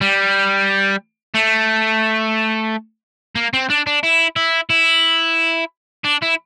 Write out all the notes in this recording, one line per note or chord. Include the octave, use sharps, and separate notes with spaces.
G3
A3
A#3
C4
D4
D4
E4
E4
E4
D4
E4